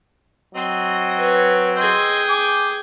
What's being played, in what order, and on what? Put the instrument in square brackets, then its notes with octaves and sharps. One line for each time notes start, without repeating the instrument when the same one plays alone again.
[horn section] F#3 C4 [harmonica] D#5
[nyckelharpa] B4 C#5
[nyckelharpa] G#4 G5 [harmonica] D#5 C6 E6
[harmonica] G#5 D6